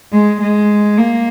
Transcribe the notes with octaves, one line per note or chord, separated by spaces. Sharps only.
G#3
G#3
A#3